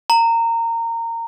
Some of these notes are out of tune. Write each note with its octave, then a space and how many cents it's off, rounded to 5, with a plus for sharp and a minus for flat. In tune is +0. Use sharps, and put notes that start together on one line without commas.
A#5 -20